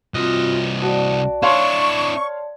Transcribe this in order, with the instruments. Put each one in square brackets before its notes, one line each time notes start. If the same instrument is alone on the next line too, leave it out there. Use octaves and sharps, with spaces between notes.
[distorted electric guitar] C2 D#5 [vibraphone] C4 F4 F#4
[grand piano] F#4 [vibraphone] D5 A5
[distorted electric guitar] D4 E4 [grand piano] C#5 F5 C6 [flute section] C#6